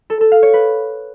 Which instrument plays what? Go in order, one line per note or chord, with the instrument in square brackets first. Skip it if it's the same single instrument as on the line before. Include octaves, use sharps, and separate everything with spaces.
[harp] A4
A4
F5
C#5
B4